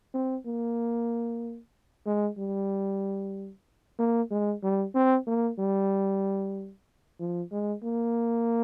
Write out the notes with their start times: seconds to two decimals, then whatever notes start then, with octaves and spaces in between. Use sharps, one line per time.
0.14 C4
0.46 A#3
2.07 G#3
2.38 G3
3.99 A#3
4.31 G#3
4.63 G3
4.95 C4
5.27 A#3
5.59 G3
7.20 F3
7.52 G#3
7.83 A#3